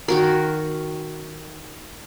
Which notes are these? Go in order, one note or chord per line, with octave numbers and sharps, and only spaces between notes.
D#3 F#4 A#4